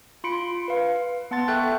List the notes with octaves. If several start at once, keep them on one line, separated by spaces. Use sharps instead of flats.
F4 B5 C6 C#7 D7
B4 F5
B3 F#5 A5 C6 A6
A4 E5 G5 C#6 F#6 G6